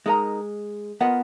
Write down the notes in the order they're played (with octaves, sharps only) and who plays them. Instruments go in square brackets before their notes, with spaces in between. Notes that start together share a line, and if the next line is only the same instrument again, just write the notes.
[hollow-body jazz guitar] G#3 [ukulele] D#4 A#4 D#5 A#5
[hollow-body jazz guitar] B3 [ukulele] F4 A#4 D#5 F#5